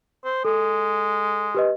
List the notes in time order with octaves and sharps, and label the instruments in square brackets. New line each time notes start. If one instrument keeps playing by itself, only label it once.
[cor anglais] C5
[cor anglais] G#3 [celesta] A4
[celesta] G4 B4 D#5